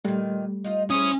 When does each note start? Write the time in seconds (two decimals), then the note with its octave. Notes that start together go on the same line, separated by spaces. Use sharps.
0.05 A#2 D#3 G3 A3
0.64 D#4 F4 D#5
0.90 C#4 E4 G#4 C5 D#6